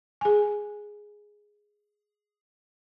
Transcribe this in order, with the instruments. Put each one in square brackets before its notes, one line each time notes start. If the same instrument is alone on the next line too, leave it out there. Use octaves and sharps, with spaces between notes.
[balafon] G#4 G#5